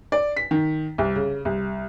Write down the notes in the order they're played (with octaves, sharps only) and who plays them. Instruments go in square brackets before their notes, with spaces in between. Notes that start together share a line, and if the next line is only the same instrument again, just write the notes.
[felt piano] D5
B6
D#3
C2
C#3
C2